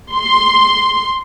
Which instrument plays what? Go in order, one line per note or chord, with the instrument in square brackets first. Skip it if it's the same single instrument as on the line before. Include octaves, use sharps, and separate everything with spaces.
[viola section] C6